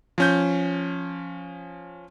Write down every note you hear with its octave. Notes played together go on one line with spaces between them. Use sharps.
F3 C#4 G6